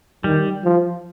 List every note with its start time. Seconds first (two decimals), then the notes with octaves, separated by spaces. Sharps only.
0.24 D#3 G3
0.65 F3